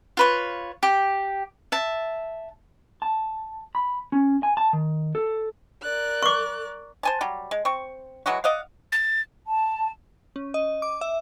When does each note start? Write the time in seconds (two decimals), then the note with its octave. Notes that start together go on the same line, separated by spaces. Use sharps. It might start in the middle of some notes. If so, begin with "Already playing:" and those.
0.17 F4 B4 C#5
0.83 G4 G5
1.72 E5 A5
3.02 A5
3.75 B5
4.12 C#4
4.43 G#5
4.57 A5
4.73 D#3
5.15 A4
5.82 A#4 D5 F#6
6.23 C#6 D6
7.03 C5 G#5 A5
7.21 F#3 G3
7.51 G#3
7.65 C4 C#6
8.26 E3 F#3 G#3 F#4
8.44 D5 D#5 F5 F#5
8.92 A6
9.46 A5
10.36 C#4
10.54 D#5
10.82 D6
11.01 E5